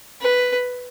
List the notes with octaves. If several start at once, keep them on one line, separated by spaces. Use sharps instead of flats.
B4